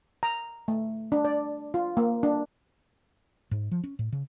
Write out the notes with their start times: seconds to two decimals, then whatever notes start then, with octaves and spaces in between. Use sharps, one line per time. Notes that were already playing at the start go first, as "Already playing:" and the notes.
0.23 A#5
0.68 A3
1.12 D4
1.25 D5
1.74 F4
1.97 A#3
2.23 D4
3.51 G#2
3.71 F3
3.84 C#4
3.99 A2
4.13 C#3